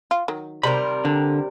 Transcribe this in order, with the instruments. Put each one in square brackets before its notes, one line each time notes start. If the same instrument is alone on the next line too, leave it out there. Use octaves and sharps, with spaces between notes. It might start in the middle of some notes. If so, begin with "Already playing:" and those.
[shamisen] F4
D#3 F#3
[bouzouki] C3 G3 A#4 [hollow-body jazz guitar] B5
[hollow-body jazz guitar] D3